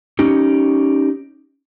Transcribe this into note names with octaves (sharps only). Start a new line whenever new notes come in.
C#4 D#4 G4